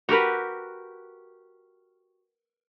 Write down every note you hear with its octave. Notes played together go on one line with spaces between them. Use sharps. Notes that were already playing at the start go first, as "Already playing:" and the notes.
F#4 G4 A#4 B4